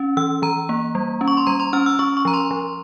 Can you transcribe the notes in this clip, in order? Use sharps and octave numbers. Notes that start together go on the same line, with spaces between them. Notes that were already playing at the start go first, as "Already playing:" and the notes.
Already playing: C#4
E3 E6
E3 A#5
A#3
G3
C#4
C#6
C6
G3 A#5
C6
C#4 F6
E6
C#4 C#6
C#6
F3 A#5
C6
F3